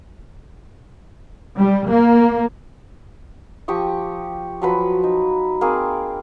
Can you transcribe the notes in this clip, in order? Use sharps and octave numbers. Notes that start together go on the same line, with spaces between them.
G3
A#3
F3 G4 C#6 D#6
F3 F#3 B4
D#4
A#3 C4 G#4